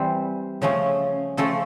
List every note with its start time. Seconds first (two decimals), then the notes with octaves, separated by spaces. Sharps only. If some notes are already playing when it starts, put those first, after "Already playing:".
Already playing: E3 G3 C4
0.62 C#3 F3 A3 C#4
1.37 C#3 F3 A3 C#4 A4